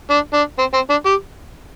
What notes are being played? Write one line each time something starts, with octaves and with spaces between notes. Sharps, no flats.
D4
D4
C4
C4
D4
G4